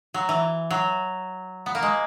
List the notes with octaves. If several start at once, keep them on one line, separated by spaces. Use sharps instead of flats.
F#3
E3
F#3
B3
A#3
G#3